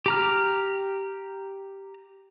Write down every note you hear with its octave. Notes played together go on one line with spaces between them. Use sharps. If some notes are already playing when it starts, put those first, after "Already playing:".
G4 A#5 F6